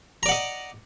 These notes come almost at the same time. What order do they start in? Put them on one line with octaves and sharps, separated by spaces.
A#5 D5 F#5 D#5